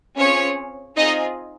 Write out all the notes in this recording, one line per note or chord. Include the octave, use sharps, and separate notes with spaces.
C4 C#4 F4 G#4 C#5
C4 D#4 F4 G#4 D#5